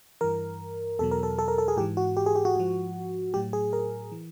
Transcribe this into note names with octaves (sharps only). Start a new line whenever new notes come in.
G2 E3 A#4
E2 B2 F#3 A4
A#4
A4
A4
A#4
A4
G#4
G#2 E3 G4
F#4
G4
G#4
G4
F#4
G#2 F3
A2 F#3 G4
G#4
A#4
E3